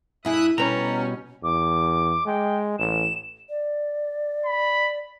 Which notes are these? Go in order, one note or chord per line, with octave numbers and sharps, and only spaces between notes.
G2 E4 G#4 E5 D#6 F#6
B2 G3 C#4 B4 A#5
E2 D6
G#3 G5
A1 E7
D5
B5